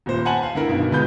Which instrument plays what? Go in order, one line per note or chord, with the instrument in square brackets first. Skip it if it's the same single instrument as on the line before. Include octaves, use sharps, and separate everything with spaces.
[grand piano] D#1 A#2 C5
F#5 G#5 A5 B5 F#7
F5
D3 E4 A#4
G2 B2 D#3
D2 G#3 B3 F4 B5 G6